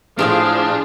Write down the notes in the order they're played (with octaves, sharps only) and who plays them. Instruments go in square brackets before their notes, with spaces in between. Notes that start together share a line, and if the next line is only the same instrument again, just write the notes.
[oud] A2 E4 G4 [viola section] F3 G#4 F5 [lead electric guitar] D4